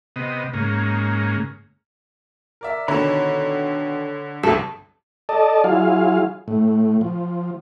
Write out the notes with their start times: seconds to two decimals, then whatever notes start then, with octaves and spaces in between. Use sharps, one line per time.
0.16 C3 B3 D#5
0.54 G#2 C#3 A#3
2.61 A#4 D5 E5
2.88 B2 D3 D#3 C#5 A#5 B5 E7
4.43 G1 C2 G2 C3 F3 C4 A4
5.29 A4 D5 D#5 A5
5.64 F#3 E4 F4 G#4 F5
6.48 A2
7.01 F3